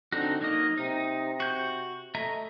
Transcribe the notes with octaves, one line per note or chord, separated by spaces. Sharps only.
D3 C4 D#4 F#4
F#3 A#3 D#4 D#5
C3 D#4
F#4 G6
A3 D#5 E5 A#5